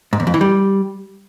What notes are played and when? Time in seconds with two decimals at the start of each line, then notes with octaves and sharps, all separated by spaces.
0.13 G#2
0.20 E2
0.27 F2
0.34 E3
0.41 G3